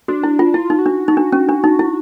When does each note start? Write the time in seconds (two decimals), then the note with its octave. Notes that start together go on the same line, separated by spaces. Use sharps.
0.08 D4 F#4
0.24 E4
0.39 F4
0.54 E4 F4
0.70 D#4
0.79 F#4
0.86 D4
1.08 D#4
1.17 D4
1.32 C#4
1.49 D4
1.64 D#4
1.79 E4